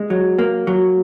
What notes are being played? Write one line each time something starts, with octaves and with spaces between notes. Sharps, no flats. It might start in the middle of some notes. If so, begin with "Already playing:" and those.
Already playing: G#3
F#3
A#3
F#3